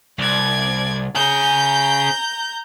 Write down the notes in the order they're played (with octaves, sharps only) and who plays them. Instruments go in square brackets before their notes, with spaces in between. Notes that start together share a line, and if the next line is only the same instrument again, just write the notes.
[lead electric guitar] C2 [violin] D5 G#6
[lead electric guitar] C#4 G#4 [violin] A#5 G6